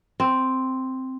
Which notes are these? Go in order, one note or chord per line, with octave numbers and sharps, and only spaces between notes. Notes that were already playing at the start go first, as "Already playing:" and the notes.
C4